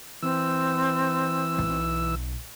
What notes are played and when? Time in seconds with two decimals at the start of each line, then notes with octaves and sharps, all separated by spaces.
0.23 E3 C4 E6
1.58 B1 B2